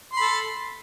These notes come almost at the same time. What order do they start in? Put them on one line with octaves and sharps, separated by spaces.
C6 B5 A4